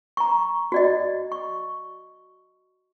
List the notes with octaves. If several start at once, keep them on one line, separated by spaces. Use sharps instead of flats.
A#5 C#6
F#4 D5 D#5
C#6